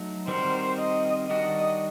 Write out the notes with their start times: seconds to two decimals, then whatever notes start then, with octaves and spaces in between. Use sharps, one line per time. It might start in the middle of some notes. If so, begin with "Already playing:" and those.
Already playing: F#3 A3 D#4
0.27 D#3 G3 C4 F#4 A#4 C5
0.78 D#5
1.29 D#3 G3 D4 F#4 D#5